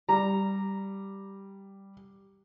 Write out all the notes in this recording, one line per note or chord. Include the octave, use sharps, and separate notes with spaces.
G3 A#5